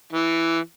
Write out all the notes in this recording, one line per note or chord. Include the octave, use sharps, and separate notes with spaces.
E3